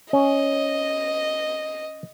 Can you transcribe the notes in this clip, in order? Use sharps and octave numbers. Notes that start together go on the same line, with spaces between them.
C#4 D#5